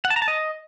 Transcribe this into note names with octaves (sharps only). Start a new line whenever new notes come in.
F#5
A5
A#5
A5
D#5